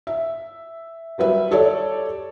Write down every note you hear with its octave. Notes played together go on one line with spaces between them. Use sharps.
E5
F#3 G3 B4 E5
G4 A4 C#5 D5